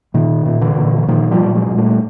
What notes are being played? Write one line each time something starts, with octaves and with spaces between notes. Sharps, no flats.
A#2 D#3
A#2
D3 E3
A#2
E3
A#2 D#3 F3
F3 G3
A#2
F#3 G#3
A#2
G3 A3